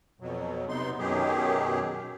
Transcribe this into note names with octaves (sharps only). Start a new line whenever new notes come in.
F2 B2 F#3
C3 B3 D#4 C6
F#2 B2 D#3 F#3 G4 G#4